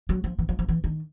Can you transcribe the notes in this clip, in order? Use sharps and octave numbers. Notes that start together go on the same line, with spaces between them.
F#3
F3
E3
F3
F3
E3
D#3